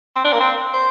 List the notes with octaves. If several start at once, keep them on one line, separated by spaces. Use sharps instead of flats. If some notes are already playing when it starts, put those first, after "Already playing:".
C4
D4
A#3
C4
C5